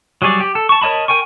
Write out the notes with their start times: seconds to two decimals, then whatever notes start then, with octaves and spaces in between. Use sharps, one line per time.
0.22 F#3 G3 G#4 C#5 D5
0.40 G4
0.55 A4
0.69 A5 C#6
0.82 A#4 C#5 D#5 A5 B5
1.08 A#4 G5 G#5 C#6